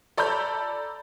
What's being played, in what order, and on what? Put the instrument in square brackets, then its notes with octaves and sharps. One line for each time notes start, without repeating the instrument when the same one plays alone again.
[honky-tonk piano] A4 D5 A#5 B5 G6